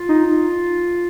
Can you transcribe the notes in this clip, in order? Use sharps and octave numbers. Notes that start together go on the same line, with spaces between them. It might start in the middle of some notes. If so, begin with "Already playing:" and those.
Already playing: F4
D#4